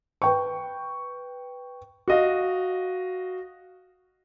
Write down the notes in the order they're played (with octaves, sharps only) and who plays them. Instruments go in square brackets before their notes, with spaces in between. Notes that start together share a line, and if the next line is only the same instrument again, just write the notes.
[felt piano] B4 G5 C#6
[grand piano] F#4 D#5 F5